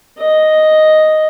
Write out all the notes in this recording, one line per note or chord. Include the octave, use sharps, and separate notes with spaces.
D#5